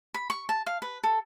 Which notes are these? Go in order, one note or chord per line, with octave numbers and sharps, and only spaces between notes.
B5
C#6
A5
F5
B4
A4